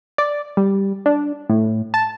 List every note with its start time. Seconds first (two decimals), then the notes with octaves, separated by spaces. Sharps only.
0.18 D5
0.57 G3
1.06 D4
1.50 A2
1.94 A5